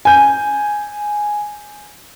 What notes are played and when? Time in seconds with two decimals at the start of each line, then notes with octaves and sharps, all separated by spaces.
0.05 G#5 G6